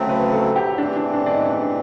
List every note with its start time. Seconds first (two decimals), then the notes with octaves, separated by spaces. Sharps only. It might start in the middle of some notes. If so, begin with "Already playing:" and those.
Already playing: D2 C#3 F#3 A3 C4 C#5
0.09 B4
0.32 A4
0.56 G4
0.78 C3 E3 A3 C4 D4
0.96 D4
1.13 D4
1.26 D4
1.31 D#4
1.49 D4